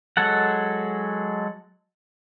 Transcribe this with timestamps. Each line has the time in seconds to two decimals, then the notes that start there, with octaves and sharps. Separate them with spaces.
0.17 F#3 G#3 A4 F#5